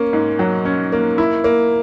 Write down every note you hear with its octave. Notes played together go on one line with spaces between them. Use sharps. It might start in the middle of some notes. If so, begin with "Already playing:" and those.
Already playing: A#3 C#4
G#2
F#3
C#4
A#3
E4
A#3